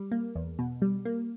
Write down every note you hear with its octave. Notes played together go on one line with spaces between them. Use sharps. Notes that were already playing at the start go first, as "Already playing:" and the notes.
Already playing: G3
A#3
E2
B2
G3
A#3